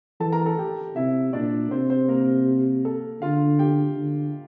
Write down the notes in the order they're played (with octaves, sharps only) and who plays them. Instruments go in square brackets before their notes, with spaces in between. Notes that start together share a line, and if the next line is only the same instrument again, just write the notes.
[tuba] E3 [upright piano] A4 A5
[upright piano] A#4 A#5
A4 A5
G4 G5
[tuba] C3 [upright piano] E4 E5
[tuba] A#2 [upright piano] D4 D5
[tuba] C3 [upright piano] C4 C5
[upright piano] C4 C5
A#3 A#4
A4
[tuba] D3 [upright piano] F4 F5
[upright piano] G4 G5
[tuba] D3